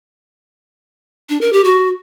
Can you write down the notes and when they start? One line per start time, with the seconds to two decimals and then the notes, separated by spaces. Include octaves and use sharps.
1.29 D4
1.41 A#4
1.53 G4
1.64 F#4